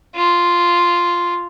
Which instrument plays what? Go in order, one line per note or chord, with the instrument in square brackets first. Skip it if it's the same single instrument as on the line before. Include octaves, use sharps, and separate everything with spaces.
[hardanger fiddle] F4